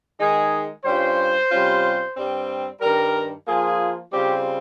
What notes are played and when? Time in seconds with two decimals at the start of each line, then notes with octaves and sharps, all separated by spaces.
0.19 D#3 G#3 D#4 G#4
0.85 G2 G3 C#4 F4 C5
1.50 C3 G3 C#4 F4
2.16 G2 G3 C4
2.81 G2 D#3 G3 A#4
3.47 F3 A#3 F4 G#4
4.12 C#3 G3 C4 F4 G4